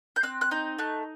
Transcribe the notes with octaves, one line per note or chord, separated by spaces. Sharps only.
G6
C4 F#6
F#6
D#4 G6
A3 F#6